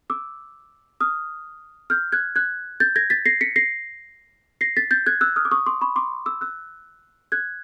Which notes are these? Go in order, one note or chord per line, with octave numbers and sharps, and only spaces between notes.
D6 E6
D#6 F6
F6 G6
F#6 G#6
F#6 G#6
G6 A6
G#6 A#6
A6 B6
A#6 C7
B6 C#7
A#6 C7
A#6 C7
A6 B6
G6 A6
F#6 G#6
E6 F#6
D#6 F6
D6
C#6 D#6
C6 D6
B5 C#6
C6 D6
D6 E6
E6 F#6
F#6 G#6